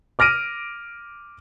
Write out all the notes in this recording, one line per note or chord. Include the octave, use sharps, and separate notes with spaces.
D6 F6 A#6 D7 D#7